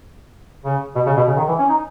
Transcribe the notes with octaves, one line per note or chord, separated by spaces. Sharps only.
C#3
B2
C#3
B2
C#3
D#3
E3
C#4
D#4